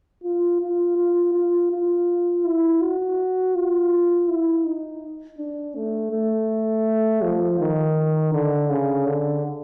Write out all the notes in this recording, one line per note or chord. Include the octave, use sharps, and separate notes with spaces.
F4
F4
F4
F4
F4
E4
F#4
F4
E4
D#4
D4
A3
A3
F3
D#3
D3
C#3
D3